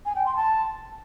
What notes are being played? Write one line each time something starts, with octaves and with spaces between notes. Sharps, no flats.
G#5
G5
C6
A5